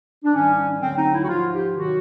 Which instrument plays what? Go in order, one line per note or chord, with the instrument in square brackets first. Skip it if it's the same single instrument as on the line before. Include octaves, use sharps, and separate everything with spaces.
[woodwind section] D4
G#2 D#3 G3 C#4
D2 D3 F#3 C4
D#4
E4
F#4
G#2 F3 F4
G4
C3 D#3 F#3 F#4